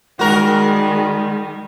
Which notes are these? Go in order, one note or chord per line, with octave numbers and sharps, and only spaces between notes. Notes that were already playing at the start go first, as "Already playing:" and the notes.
D#3 G3 G#3 F#4 A#4